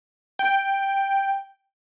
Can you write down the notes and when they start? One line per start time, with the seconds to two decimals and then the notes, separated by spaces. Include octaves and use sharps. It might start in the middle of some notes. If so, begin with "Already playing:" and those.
0.39 G5